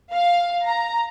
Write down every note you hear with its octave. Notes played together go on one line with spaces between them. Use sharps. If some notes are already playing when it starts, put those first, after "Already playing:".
F5
A#5